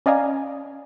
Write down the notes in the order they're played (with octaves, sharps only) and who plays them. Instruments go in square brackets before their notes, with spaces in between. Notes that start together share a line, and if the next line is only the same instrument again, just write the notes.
[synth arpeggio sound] C#4 D5 D#5 F5 G#5 A#5